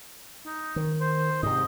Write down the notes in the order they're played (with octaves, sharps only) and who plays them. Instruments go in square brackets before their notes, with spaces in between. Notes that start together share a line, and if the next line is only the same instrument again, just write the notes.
[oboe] D#4
[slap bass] D#3
[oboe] C5
[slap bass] G#2 C3 [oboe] D#5